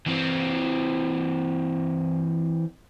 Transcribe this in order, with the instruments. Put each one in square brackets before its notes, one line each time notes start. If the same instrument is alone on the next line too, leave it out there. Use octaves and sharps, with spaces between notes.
[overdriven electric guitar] E3 C4